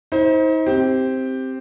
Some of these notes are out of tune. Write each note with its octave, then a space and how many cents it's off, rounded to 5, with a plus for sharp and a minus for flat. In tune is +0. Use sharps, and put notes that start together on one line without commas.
D#4 +40 C5 +10
C4 +0 G4 +0